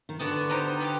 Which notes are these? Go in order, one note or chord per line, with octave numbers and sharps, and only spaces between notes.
D#3
D3 B3 D4 F#4 B4
B3 D#4 G4 C5
B3 E4 G4